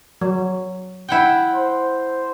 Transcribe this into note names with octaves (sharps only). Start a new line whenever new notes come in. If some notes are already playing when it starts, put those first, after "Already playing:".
F#3
E4 F#5 G5
C5